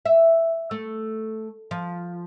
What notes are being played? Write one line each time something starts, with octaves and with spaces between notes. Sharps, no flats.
E5
A3
F3